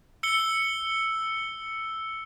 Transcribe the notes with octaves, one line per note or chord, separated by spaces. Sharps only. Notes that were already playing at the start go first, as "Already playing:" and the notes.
E6 C#7 G7